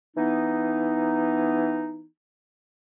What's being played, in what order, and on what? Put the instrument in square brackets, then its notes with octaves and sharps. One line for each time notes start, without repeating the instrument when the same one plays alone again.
[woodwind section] E3 B3 D#4